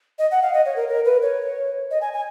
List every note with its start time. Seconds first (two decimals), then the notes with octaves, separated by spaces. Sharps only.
0.19 D#5
0.31 F#5
0.42 F5
0.53 D#5
0.65 C#5
0.76 A#4
0.88 A#4
1.05 B4
1.22 C#5
1.91 D#5
2.01 G#5
2.13 G#5